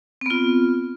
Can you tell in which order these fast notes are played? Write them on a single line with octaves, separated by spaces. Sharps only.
C4 B3 F4